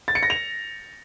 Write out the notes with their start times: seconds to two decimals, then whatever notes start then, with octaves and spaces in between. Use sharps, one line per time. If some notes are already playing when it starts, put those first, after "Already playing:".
0.08 A6
0.15 C#7
0.23 A#6
0.30 F7